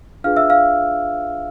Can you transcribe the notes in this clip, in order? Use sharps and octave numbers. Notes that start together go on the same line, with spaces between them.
D4 F4 G#4 B4 F5 F6
E5 E6
F5 F6